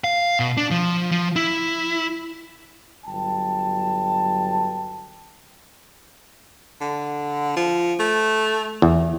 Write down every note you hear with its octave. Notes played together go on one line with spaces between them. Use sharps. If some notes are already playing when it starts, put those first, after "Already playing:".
F5
B2
D4
F3
F3
E4
G1 F#3 G5 A5
D3
F3
A3
E2